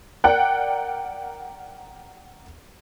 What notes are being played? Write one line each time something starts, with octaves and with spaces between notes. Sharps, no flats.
A#4 D5 F#5 G5 F#6